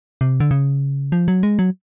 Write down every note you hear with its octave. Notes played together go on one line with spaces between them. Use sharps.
C3
D3
C#3
F3
F#3
G#3
F#3